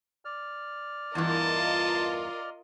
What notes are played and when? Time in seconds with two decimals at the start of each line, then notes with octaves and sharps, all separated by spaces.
0.25 D5 F6
1.15 E2 G2 E3 F4 A#4 D#5 A5